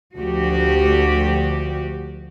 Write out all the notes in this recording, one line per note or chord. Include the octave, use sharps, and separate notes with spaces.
D2 F3 F#4 G4